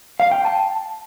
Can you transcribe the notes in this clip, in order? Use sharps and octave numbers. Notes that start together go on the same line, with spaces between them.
F5
G5
A5